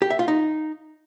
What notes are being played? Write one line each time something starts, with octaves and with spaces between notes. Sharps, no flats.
G4
E5
F4
D#4